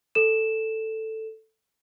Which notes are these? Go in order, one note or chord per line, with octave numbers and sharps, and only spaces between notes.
A4 E7